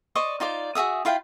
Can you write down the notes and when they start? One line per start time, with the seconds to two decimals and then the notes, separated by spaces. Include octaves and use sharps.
0.15 C5 D5 D#5 C#6
0.40 D#4 F4 C5 D5
0.75 F#4 G#4 E5 D#6
1.05 E4 F4 F5 G5